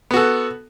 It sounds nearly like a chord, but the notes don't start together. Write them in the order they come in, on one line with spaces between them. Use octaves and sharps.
B3 F#4 A4